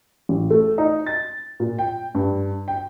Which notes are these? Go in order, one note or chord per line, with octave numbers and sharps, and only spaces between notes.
A1
A3
D#4
A6
A#2
G5
G2
G5